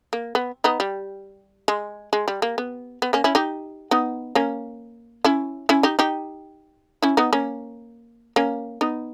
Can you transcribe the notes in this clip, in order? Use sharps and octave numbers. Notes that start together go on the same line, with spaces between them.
A#3
B3
B3 D#4
G3
G#3
G#3
G3
A#3
B3
B3
A#3 C#4
C#4 E4
D#4 G4
B3 D#4
A#3 C#4
C#4 E4
C#4 E4
D#4 G4
D#4 G4
C#4 E4
B3 D#4
A#3 C#4
A#3 C#4
B3 D#4